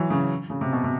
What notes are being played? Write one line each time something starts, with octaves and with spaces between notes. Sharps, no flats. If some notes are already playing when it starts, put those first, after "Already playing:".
Already playing: E3 F#3
C#3
C#3
C3
B2
C3